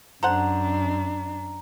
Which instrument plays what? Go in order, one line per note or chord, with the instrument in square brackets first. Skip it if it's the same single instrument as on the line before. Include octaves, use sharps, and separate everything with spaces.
[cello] F#2 D4 [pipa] A4 C5 F#5 [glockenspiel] A#5